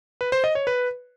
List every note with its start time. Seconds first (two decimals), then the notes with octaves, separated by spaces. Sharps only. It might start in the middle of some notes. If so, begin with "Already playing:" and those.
0.21 B4
0.32 C5
0.44 D#5
0.55 C#5
0.67 B4